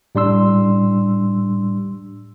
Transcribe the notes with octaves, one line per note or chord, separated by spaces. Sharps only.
A2 G3 D4 C6 E6